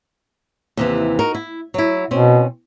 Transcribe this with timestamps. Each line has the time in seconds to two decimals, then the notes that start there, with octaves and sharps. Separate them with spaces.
0.77 D#2 C3 E3
1.19 D#4 F#4 A#4
1.35 E4
1.74 F#3 E4
2.11 B2 C4 C#4